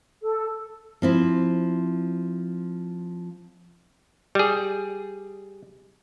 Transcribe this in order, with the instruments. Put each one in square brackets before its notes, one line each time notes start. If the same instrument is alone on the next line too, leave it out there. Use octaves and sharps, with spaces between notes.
[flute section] A4
[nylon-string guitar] F3 C4 E4
[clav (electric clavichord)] G3 G#4